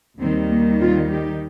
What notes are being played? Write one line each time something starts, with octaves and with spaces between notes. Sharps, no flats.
D#2 D#3 G3 C4
A#3
C4 F4
D#4 G4